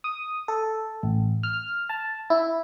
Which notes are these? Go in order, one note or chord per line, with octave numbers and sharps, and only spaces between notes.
D#6
A4
A1
F6
A5
E4